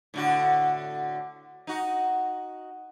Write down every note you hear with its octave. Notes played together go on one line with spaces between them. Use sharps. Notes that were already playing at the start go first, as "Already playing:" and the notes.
A2 D3 F#4
D#4 F#4